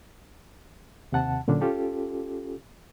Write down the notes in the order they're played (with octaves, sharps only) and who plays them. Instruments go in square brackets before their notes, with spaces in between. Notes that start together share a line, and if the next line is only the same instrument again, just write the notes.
[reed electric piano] D#2 C3 F#5 A5
A#2 D3 F#3 C#4 D4
C#4 F4 G4 A4